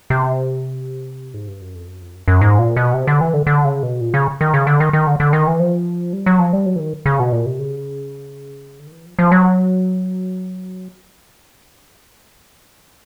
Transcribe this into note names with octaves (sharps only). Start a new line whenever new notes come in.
C3
G#2
G2
F#2
F2
F#2
F2
F#2
F#2
G#2
A#2
B2
C3
D3
E3
D3
D3
C#3
B2
A#2
C#3
D#3
C#3
D3
D#3
D#3
D3
D3
D#3
E3
F3
G3
F#3
F3
G3
F#3
E3
D#3
C#3
B2
A#2
C3
C#3
D3
D#3
E3
F3
F3
F#3